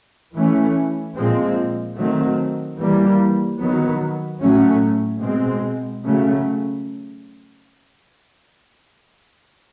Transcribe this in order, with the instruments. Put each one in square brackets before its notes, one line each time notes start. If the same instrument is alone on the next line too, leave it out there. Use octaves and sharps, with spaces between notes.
[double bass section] E3 A3 C#4
A#2 F3 G#3 C4
D#3 F#3 A3 C4
E3 G3 A#3
D#3 F#3 B3
A2 F#3 A3 C#4
B2 G#3 C4
C#3 F#3 A3